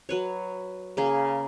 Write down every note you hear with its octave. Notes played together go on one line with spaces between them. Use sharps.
F#3 B4 C#5
C#3 A#3 G#4